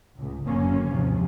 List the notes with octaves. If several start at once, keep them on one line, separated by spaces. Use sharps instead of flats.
C#2 A2
F#1 F#2 D3 A#3 C#4
D#2 G#2 C3 F3